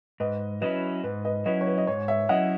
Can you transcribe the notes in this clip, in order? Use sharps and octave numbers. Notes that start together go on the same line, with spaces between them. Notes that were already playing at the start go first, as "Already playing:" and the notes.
G#2 B4 D#5
F#3 C#4 E4 B4 D#5
G#2 B4
B4 D#5
F#3 C#4 E4 B4 D#5
C#5
B4
D#5
G#2 C#5
C#5 E5
F#3 C#4 E4 D#5 F#5